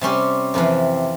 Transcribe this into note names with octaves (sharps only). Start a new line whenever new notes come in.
C3 G3 C#4 G4
F2 C3 E3